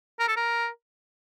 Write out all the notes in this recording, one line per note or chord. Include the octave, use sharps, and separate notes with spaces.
A#4
A4
A#4